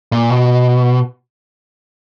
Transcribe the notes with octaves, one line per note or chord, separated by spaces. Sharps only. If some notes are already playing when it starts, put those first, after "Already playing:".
A#2
B2